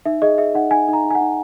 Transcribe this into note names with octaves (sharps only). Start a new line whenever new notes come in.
D#4 E5
G#4 D#5
G#4 E5
D#4 F#5
D#4 G#5
D#4
A#5
D#4
G#5
F#5
D#4